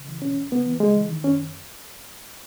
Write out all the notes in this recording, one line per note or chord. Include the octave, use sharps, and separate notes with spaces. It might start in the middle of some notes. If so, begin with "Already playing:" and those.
Already playing: C#3
E3
B2 C#4
C#2
C#3 B3
E3
C#3 G#3
E3
D#3
F#2 C#4